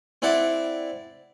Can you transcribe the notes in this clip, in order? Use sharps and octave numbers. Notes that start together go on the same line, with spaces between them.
C4 E4 D5 F#5